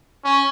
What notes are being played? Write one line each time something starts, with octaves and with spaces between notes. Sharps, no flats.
C#4